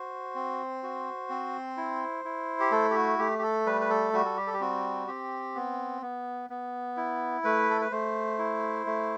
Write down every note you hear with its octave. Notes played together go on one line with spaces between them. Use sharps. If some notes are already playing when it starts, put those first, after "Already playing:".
Already playing: F#4 C5
C4
F#4
C4
E4
E4
G4
A3 A4
G4
F#4
A3 G4
G4
A4
G3 B4
B4
A4
G3 F#4
A4
G4
A4
G4
C4 F#4
C4 G4
B3
B3
B3
E4
A3 B4
A4
B4
A3 C5
E4
A3